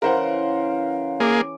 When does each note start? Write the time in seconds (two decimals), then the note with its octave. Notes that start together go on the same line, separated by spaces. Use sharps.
0.02 C#3 E3 A#4 C5 F5 F#5
1.20 A#3 G#4 D6